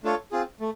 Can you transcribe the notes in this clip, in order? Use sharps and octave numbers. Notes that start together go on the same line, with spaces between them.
A3 D4 F4 A4 C#5
C4 F4 G#4
A3